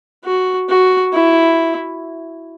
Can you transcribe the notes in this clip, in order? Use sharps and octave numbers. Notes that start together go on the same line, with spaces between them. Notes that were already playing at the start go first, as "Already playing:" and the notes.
F#4
F#4
E4